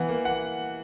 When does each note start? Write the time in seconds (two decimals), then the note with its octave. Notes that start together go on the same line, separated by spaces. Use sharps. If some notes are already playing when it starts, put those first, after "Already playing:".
Already playing: E3 B3 F#5
0.09 A#3
0.25 F#5